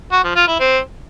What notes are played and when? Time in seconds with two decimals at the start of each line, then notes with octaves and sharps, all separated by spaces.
0.12 F#4
0.24 F3
0.36 F4
0.48 E4
0.60 C4